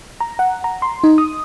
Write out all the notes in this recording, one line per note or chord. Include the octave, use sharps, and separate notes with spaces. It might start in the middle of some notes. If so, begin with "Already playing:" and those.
A#5
F#5
A#5
C6
D#4
D#6